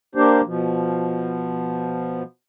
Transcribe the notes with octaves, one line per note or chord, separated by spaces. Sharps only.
A#3 D4 G4 C5
B2 F3